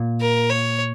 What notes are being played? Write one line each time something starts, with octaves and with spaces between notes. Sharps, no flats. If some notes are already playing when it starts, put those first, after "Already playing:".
Already playing: A#2
A#4
C#5